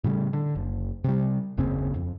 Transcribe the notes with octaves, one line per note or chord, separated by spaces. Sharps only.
A2 C#3 G3
D3
F#1
C3 G3
F#1 D#2 C#3 C4
F2